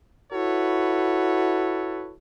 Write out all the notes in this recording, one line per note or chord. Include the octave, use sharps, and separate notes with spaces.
E4 F#4 A4 B4 C#5